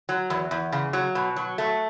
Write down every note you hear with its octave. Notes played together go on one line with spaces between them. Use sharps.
F#3
E2
E2
C#3
F#3
B2
F#3
A3